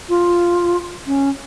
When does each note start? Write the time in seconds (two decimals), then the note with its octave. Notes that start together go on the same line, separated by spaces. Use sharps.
0.09 F4
1.07 C#4